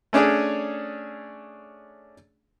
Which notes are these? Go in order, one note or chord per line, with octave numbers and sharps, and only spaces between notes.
A3 C#4 D4 G#4 C#5